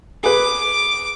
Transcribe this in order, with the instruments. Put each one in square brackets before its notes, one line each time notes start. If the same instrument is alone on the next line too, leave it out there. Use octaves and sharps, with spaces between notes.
[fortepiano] G#4 B4 [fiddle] D6